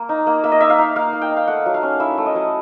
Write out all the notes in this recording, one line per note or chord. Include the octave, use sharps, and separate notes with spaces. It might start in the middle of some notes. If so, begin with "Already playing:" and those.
Already playing: A#3
D#4
A#3
A#3 E5
D#5
D#4 E5
F5
D#4
A#3 F5
A#3
G5
D#4
F5
A3 F#5
F#3
F5
C#4
E4 E5
A3
D#5
F#3